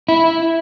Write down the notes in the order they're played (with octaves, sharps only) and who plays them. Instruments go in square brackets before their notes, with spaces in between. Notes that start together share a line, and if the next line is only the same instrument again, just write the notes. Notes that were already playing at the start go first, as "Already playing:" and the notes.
[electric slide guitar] E4